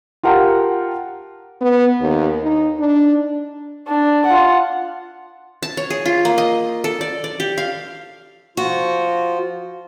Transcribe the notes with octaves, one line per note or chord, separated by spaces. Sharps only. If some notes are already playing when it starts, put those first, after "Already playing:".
F4 G4 A#4 F#5 G5 A5
B3
D#2
D#4
D4
D4
F4 F#5
A5
C#5
G#4
F4
A#3
D#5
A4
D5
D5
G4
F5
F3 F4 F#4